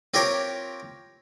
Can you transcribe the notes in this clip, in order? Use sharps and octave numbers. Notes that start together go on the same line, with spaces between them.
C4 F4 G4 A#4 C#5